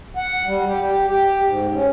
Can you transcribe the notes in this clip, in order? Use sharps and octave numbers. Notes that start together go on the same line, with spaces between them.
F#5
G3
G4
G4
G4
G#2
C#4